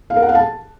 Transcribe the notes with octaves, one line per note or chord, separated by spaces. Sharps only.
F5
A#4
F#5
F5
A5